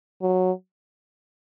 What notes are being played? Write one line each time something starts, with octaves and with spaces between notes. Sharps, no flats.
F#3